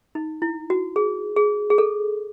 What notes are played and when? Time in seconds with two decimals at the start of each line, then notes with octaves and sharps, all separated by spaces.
0.15 D#4
0.42 E4
0.70 F#4
0.96 G#4
1.36 G#4
1.70 G#4
1.78 A4